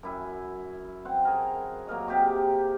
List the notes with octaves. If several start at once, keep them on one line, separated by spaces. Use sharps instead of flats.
F#2 E4 G#5
C4 F#5
G#4 A#4
F#3 A#3 A#4 D#5
C3 G4 G#4 D6